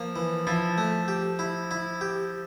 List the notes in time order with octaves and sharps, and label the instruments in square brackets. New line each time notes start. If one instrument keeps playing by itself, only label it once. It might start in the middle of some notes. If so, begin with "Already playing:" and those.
Already playing: [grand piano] F3 [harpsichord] A#3
[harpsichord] E3
[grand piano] F3 [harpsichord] E4
[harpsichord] A3
G4
E4
E4
G4